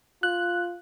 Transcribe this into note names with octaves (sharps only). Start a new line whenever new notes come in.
F4 F#6